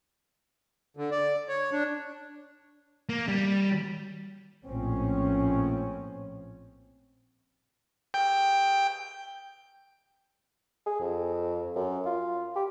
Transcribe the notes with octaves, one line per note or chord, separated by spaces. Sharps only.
D3
D5
C#5
D4
A#3
G3
A#1 A2 F3 C4 C#4
G5
G#4
F2
F#2
F4
G4